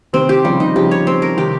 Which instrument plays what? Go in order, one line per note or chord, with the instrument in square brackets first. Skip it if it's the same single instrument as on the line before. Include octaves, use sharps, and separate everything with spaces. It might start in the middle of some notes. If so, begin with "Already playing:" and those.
[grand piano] C3 D#3 [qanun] C4
[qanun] G4
[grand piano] C#3 F3 [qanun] G3
[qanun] D#4
[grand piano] C#3 F3 [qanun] G4
[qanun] C#5
C4
A#4
[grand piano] C3 D#3 [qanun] G4